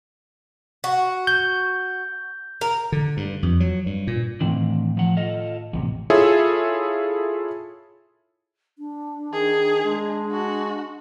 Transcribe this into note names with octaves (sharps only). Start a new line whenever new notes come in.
F#4
G6
A#4
D3
G2
F2
F#3
G2
A#2
A2 D#3 E3 C4 D4
F3 F#5
F4 A4 D#5
A1 E2 C3
E4 F4 G#4 A4 C#5 E5
D4
D#3 G#4
G#3 D4
F#4